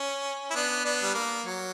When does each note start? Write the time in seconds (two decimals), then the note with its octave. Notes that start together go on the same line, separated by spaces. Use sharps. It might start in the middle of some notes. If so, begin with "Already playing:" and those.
Already playing: C#4
0.51 E4
0.55 B3 D4
0.84 B3 D4
1.03 G3
1.14 A#3
1.43 F#3